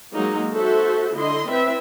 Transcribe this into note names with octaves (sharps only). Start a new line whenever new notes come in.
F#3 G#3 A#3 D#4
F#4 A4 C5 E5
D3 E4 D#5 C6
C4 E4 B4 E5